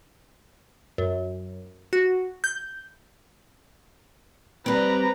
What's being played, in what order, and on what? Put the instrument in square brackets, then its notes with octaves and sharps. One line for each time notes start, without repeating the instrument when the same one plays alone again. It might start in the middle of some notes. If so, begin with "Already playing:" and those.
[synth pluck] F#2
F#4
G6
[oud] G3 C4 [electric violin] B4 A#5